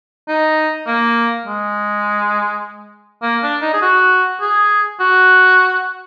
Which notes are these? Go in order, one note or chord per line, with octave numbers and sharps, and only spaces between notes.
D#4
A#3
G#3
A#3
D4
D#4
G#4
F#4
G#4
F#4